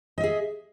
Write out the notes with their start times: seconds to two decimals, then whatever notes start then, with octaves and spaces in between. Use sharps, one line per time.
0.18 D#5
0.21 E5
0.23 G#4